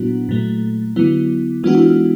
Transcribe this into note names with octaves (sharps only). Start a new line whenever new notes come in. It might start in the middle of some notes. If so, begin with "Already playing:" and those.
Already playing: A#2 F#3 B3 D4 E4 F#4
A#2 F#3 A3
D3 F#3 B3 E4
E3 G#3 B3 D4 F4 F#4
E4
F4